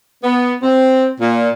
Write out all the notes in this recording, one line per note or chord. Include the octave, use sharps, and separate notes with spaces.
B3
C4
A#2